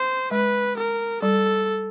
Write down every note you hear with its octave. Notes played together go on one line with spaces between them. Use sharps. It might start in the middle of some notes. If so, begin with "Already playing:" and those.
Already playing: C5
G#3 B4
A#4
G3 A4